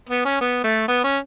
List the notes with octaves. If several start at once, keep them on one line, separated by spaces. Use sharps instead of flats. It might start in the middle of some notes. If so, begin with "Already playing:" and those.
B3
C#4
B3
A3
B3
C#4